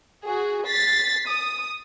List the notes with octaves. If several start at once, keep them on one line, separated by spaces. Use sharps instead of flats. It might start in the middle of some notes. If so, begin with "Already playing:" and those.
F#4 G#4
A6 B6 C7
D#6